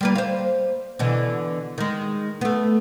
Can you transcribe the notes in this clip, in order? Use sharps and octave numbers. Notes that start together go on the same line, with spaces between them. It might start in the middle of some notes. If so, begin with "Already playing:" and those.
G3 A#3 B4
C5 F5
B2 D3 E3
D#3 G#3
A3 B3